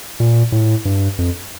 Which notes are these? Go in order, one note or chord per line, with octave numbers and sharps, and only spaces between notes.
A#2
A2
G2
F2